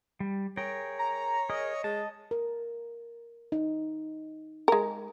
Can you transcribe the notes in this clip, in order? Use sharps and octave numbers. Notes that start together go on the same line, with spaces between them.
G3
G#4 A#4 C#5 G5
A#5
G#4 A#4 D#5
G#3 A5
A#4
D#4
G#3 A#4